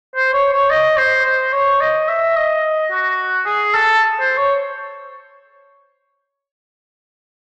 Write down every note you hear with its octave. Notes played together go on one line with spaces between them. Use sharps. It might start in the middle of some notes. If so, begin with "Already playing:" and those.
C5
C#5
C#5
D#5
C5
C5
C#5
D#5
E5
D#5
F#4
G#4
A4
C5
C#5